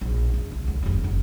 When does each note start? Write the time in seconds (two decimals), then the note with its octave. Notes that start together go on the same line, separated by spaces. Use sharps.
0.01 A#1
0.34 E2
0.52 C#2
0.68 D2
0.83 F#1 D#2
1.04 F#1